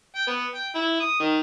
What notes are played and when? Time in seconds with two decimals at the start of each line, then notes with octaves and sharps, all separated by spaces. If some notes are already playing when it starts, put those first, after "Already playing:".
0.15 G5
0.27 B3
0.55 G5
0.75 E4
1.00 D#6
1.20 D#3